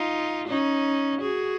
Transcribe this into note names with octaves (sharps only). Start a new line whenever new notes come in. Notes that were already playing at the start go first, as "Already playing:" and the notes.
Already playing: D#4 F4
C#4 D#4
F#4 G#4